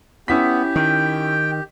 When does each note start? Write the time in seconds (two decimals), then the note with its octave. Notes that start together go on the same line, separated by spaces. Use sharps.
0.28 B3 C#4 E4 G4 B6
0.76 D#3 G5